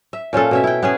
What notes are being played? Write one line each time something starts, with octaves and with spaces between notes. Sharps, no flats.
E5
A#2 C#4 F4 A4
B2 C#4 E5
E4 G5
B3 C#4 G#4